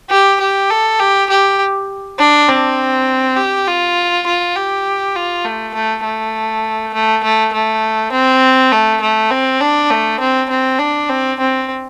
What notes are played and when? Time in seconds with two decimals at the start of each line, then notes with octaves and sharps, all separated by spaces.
0.10 G4
0.40 G4
0.70 A4
1.00 G4
1.30 G4
2.18 D4
2.48 C4
3.37 G4
3.67 F4
4.26 F4
4.56 G4
5.16 F4
5.45 A3
5.74 A3
6.04 A3
6.94 A3
7.24 A3
7.53 A3
8.12 C4
8.72 A3
9.01 A3
9.31 C4
9.61 D4
9.91 A3
10.20 C4
10.50 C4
10.79 D4
11.09 C4
11.40 C4